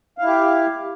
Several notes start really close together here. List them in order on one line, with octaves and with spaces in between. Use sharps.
F5 E4 G4